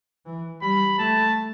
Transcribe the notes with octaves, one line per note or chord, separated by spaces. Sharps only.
E3
G3 B5
A3 A5